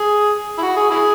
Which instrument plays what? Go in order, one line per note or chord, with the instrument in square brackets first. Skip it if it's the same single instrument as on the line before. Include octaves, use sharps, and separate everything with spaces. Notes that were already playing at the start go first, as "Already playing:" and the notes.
Already playing: [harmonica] G#4
E4
F#4
G#4
E4 G#4